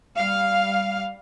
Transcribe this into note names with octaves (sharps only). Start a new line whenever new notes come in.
G3 F5